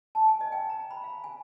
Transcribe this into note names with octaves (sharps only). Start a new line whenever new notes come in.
A5
G#5
D#5
G5
A#5
B5
F5
G#5